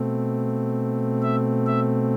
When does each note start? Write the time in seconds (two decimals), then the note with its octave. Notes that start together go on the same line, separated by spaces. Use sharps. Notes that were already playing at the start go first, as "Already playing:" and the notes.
Already playing: B2 A3 C4
1.22 E5
1.66 E5